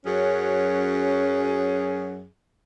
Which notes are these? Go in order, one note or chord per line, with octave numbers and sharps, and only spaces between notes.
F#2 F#3 C#4 G#4